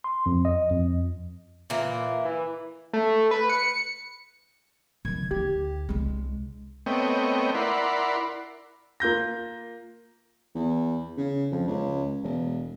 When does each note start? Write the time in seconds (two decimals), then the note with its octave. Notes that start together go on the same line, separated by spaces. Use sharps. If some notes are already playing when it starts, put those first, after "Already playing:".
0.04 C6
0.26 F2
0.45 D#5
0.71 F2
1.70 A#2 E3 A#3
2.25 E3
2.93 A3
3.31 B4
3.50 C#7
5.05 D#3 F#3 G#6
5.31 D2 D#4 G4
5.89 C2 G#3 D4
6.86 A3 B3 C4 C#5 D#5 G5
7.55 E4 A#4 D5 F#5 B5 C6
9.00 A#3 F4 G6 A#6
10.55 E2
11.17 C#3
11.51 F2
11.67 C#2
12.23 E1